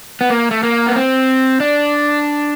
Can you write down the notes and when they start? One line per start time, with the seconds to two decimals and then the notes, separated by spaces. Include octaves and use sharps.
0.21 B3
0.30 A#3
0.51 A3
0.63 A#3
0.87 B3
0.96 C4
1.60 D4